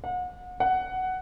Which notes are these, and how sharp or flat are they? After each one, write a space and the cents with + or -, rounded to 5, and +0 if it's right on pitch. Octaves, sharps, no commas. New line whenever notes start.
F#5 -35
F#5 +10